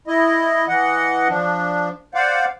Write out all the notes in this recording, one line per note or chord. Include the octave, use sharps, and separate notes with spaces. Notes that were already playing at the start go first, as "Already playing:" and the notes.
E4 D#5
E3 D#5 F#5
F3 D4
C5 D5 F5 F#5